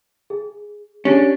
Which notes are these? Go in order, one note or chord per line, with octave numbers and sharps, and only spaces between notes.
G#4
C#4 D4 G4 G#4